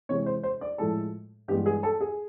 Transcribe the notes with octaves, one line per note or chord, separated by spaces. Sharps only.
C3 E3 G#3 C4 C#5
C5
C5
D5
A2 F3 G#3 A4
G2 E3 G#3 B3 G4
G#4
A4
G#4